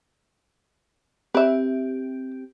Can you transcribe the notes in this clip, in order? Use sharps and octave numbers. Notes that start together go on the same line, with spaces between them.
C4 G4 B4 E5